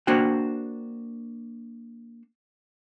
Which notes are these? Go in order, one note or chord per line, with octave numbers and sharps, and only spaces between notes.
A#3 D4 F#4 C5 G5